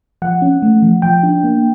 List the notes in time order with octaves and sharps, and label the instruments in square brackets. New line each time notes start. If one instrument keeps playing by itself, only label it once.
[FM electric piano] F3 F#5
C#4
A3
F3
F3 G5
D4
A#3